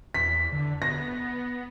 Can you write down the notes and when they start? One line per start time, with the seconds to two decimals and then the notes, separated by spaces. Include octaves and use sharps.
0.14 E2 B6
0.52 D3
0.82 B3 A#6